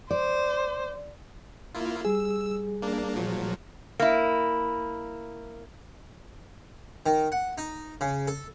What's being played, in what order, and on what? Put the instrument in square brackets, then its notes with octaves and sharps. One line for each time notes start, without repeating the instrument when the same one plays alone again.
[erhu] C5 [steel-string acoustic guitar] D5
[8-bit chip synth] A#3 E4 F4
[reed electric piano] G3 G#4 [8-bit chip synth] E6
[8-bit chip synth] A#3 D4
A#2 F3 F#3
[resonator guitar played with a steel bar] A#3 E4
[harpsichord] D#3
F#5
D#4
C#3
A4